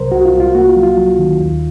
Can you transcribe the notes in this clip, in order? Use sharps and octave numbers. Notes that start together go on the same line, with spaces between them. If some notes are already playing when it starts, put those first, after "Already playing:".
Already playing: C2 C3 F#3 A#4 C5
C2 F#4
F4
C2
F4
A#3 F#4
F4
F#3
F4
F#3
D#3
D#2